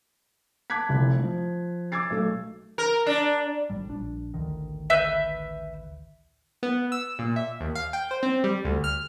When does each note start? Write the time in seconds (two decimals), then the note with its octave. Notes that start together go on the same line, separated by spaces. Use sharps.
0.70 A5 D6 F#6 G#6 B6
0.89 F1 C2
1.19 F3
1.92 D6 E6 G#6 A6 C7
2.10 B1 A3
2.78 A#4
3.06 D4
3.70 G#1 A2 G3
3.89 A#1 D4
4.34 A1 D2 D#3
4.90 B4 E5 G6
6.63 B3
6.92 E6
7.19 A#2
7.36 E5
7.61 D#2
7.75 F5
7.93 G5
8.11 C5
8.23 C4
8.44 G3
8.65 D2
8.84 F6